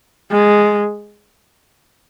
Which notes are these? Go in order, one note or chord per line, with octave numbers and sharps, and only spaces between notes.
G#3